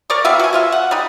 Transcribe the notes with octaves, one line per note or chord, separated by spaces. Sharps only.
A#4 D5 C#6
B3 G4 E5 F5
F#4 G#5
G#3 F4 E5
F#5
G3 D#4